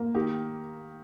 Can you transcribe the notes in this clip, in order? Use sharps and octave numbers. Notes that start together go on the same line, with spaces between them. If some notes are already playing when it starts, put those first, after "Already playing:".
Already playing: A#3
D#3 G4